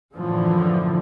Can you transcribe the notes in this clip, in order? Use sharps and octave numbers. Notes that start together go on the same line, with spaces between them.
F#2 A2 D3 E3 F3